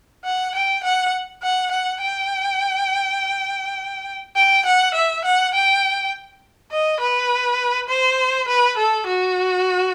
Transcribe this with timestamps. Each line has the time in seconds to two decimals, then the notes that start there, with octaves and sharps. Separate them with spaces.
0.24 F#5
0.55 G5
0.84 F#5
1.43 F#5
1.71 F#5
2.01 G5
4.36 G5
4.66 F#5
4.94 E5
5.25 F#5
5.54 G5
6.72 D#5
7.00 B4
7.89 C5
8.48 B4
8.77 A4
9.07 F#4